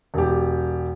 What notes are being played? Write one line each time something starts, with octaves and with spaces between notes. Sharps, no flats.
E1 G4